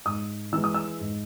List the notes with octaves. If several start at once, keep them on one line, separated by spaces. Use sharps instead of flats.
G#2 D#6
E3 G#3 E6
D#6
E6
G#2